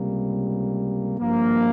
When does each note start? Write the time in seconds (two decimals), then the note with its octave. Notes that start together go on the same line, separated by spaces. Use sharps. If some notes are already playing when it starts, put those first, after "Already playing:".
Already playing: C#2 C3 G3 A#3
1.19 G#1 G2 F3 A#3